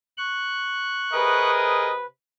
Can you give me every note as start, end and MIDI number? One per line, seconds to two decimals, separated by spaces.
0.18 1.51 85
0.18 1.51 90
1.13 2.05 48
1.13 1.92 68
1.13 1.92 70
1.13 2.05 71
1.13 1.92 75